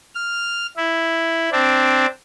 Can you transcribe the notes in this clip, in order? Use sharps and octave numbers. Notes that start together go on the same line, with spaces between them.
F6
E4
C4 D4